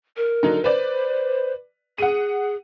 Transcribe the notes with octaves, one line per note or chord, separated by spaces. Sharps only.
A#4
D3 F#3 D#4
B4 C5 D5
G#4 F#5 D#7